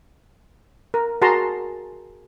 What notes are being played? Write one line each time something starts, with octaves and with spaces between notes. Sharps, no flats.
A#4
F#4 G#4 A#4 A5 A#5 C6